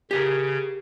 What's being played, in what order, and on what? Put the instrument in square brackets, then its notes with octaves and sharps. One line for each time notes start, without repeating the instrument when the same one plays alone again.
[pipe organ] C#3 [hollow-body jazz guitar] G4 G#4 A#4